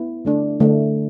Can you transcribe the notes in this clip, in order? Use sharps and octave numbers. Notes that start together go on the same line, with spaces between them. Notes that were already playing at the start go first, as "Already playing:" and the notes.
Already playing: B3 E4
D3 A3 D4
D3 A3 D4